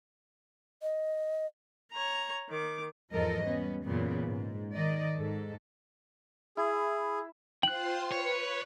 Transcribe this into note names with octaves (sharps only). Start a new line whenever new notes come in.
D#5
C#5 A#5
D#3 D6
E2 G#2 F3 A4 A#4 D#5
G3 B3 C#4
F#2 A#2 C#3 E3 B3
G#2
D#3 D5 D#5
G#2 A4
E4 G#4
F4 C5 G5 C6 F#6 F#7
B4 C#5